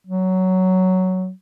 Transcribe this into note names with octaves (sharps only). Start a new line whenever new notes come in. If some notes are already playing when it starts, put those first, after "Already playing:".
F#3